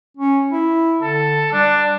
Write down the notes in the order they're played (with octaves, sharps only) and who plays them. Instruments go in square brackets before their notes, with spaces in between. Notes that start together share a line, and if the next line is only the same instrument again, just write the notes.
[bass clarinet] C#4
E4
[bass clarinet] D3 [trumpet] A4
[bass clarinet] G3 [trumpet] D4